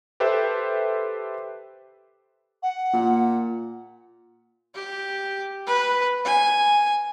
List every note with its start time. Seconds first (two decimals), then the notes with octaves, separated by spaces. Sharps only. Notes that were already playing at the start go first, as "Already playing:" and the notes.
0.20 G4 A4 B4 C5 E5
2.63 F#5
2.93 A#2
4.75 G4
5.67 B4
6.25 G#5